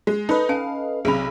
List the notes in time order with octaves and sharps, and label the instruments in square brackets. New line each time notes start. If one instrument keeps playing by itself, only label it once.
[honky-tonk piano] G#3
[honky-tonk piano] D#4 [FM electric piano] A4 B4 D#5
[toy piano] C#4 G#5 A5 [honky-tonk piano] F5
[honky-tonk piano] B1 C3 [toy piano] G#4 B5